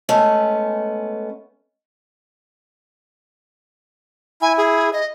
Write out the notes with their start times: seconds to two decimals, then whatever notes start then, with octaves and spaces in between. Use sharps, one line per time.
0.09 G#3 A3 B3 C#4
4.42 E4 G#5
4.58 G#4
4.93 D#5